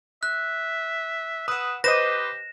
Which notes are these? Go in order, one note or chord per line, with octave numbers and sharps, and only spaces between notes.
E5 F#6
B4 F#5 D#6 E6
G4 B4 C5 D#5 D6 D#6 A#6 E7